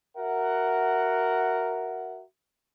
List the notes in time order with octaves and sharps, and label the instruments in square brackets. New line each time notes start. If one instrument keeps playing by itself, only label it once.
[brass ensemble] F#4 A#4 E5 F#5